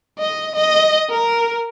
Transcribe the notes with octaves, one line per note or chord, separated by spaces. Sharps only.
D#5
D#5
A#4